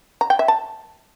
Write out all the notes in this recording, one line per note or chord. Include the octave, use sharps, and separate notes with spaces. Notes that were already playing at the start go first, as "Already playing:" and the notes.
A#5
G5
E5
A5